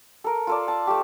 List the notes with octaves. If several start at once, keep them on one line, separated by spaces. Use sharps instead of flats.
A4 A#4
F4 A4 D5
A5
A3 G4